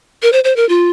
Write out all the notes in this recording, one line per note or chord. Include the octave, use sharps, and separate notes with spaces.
A#4
C5
C5
A#4
F4